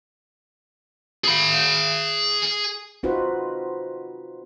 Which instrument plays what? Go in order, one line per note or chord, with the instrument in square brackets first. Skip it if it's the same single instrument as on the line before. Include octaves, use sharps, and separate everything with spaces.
[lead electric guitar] G#4 B5
[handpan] C4 D#4 F4 F#4 B4 C5